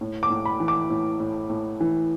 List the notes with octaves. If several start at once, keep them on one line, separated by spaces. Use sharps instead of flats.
A2
D6
A2
B5
E3
D6
A2
A2
A2
E3